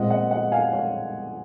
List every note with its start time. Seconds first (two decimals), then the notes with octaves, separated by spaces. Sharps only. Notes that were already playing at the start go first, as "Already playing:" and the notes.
Already playing: A#2 G#3 C4 D#5 F#5
0.10 D#5 F#5
0.31 D#5 F#5
0.52 F5 G#5
0.73 C#5 F5